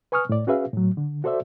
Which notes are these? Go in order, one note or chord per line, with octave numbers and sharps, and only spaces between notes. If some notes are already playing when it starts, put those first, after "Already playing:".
B4 G#5 C#6 D#6 F6
A2 D5
C#4 F#4 G#4 B4 E5 F5
A2 F#3
D3
F#4 A4 C5 D5 E5